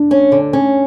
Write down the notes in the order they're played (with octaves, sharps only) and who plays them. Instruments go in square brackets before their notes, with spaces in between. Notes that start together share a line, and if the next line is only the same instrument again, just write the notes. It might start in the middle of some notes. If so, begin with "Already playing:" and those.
Already playing: [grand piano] D4
[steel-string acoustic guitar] C#4
D3
C#4